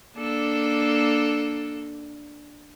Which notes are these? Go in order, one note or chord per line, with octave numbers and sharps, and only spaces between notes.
A#3 D4 A4